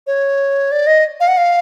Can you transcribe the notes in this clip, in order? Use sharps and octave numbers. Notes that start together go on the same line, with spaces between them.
C#5
D5
D#5
F5
F#5
F5